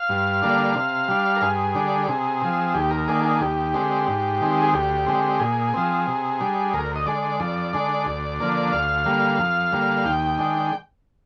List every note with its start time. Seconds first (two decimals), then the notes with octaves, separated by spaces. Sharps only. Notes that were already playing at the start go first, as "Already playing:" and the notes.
Already playing: F5
0.09 G2
0.42 D3 G3 A#3 D4
0.75 C3
1.08 G3 D4
1.36 A#4
1.42 G2 G#4
1.75 D3 G3 D4
2.08 C3 G#4
2.42 F3 C4
2.74 D#2 G4
2.91 A#4
3.08 D#3 A#3 D4 G#4
3.24 G#4
3.41 D#2 G4
3.74 D3 G#3 C4
4.08 G#2
4.41 D#3 G#3 C4
4.62 G#4
4.73 D2 G4
5.07 D3 G#3 C4
5.40 A#2 G#4
5.74 F3 C4
6.07 C3
6.40 G3 D4
6.73 D2 A#4
6.96 D#5
7.06 D3 G#3 D5
7.23 D5
7.40 F2 D5
7.73 D3 G#3 D4
8.06 D2
8.40 D3 F3 A#3 D4
8.72 D2 F5
9.06 D3 G3 A#3
9.39 F2
9.72 D3 G3 A#3
10.05 D#2 G5
10.39 D#3 G#3 D4